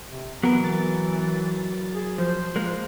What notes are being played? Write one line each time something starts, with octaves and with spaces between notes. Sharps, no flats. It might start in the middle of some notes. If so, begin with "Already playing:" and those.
C3
E3 F#3 B3 A#4
A6
G#4
F3 C5
G#3 A#3